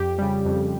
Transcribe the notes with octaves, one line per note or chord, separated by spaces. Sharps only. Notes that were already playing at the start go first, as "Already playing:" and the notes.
Already playing: F2 G4
C#3 G3
F2